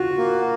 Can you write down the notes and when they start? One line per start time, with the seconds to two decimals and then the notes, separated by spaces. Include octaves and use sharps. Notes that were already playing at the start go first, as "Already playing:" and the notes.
Already playing: F4 F#4
0.18 A#3